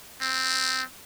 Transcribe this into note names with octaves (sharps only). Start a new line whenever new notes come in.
C4